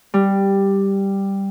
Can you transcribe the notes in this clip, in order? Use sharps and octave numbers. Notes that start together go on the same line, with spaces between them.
G3